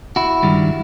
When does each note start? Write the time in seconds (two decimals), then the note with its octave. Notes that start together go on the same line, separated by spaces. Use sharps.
0.16 E4 F#4
0.43 G2 D#3 G3